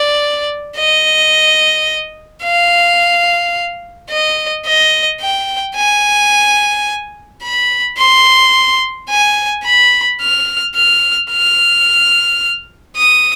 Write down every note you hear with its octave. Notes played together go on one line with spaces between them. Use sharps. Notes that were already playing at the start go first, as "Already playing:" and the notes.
Already playing: D5
D#5
F5
D#5
D#5
G5
G#5
B5
C6
G#5
B5
F6
F6
F6
D#6